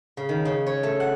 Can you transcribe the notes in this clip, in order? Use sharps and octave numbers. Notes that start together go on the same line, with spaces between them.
C#3
D#3
C#3
C#5
A3
F#5